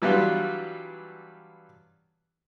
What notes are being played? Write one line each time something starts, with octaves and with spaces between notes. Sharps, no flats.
E3 F#3 G3 B3 D4 F4